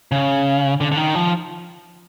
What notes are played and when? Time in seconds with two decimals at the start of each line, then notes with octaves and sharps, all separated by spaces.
0.12 C#3
0.81 D3
0.92 D3
0.97 D#3
1.15 F3